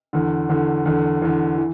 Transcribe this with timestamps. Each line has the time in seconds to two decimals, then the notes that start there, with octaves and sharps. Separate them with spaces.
0.13 E2 D3
0.49 E2 D3
0.85 E2 D3
1.22 E2 D3
1.58 E3